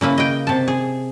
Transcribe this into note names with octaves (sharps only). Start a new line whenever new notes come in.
C#3 A#3 E4 B4
D#5 G5
C3 A5
G#4